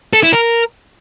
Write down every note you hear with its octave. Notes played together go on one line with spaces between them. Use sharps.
A4
E4
A#4